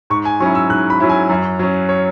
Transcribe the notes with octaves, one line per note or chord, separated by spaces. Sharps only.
G#2 C#6
G#5
F#3 C#4 E4 C#6
E6
G#2 F#6
B5
F#3 C#4 E4
G#5
F#2
F#3 C#4
C#5